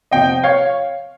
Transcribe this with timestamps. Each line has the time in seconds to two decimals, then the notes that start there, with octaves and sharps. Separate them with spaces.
0.11 F2 C3 F3 D#5 G5
0.44 C#5 F5